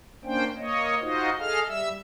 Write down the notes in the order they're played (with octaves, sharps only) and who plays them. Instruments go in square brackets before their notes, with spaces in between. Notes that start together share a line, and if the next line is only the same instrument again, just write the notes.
[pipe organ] A#3 C#4 D4 C5 G5
A#3 C#5 D#5
D#4 F4 F#4 C5 D#5
G#4 A4 D#5 F5 F6
G3 E5 E6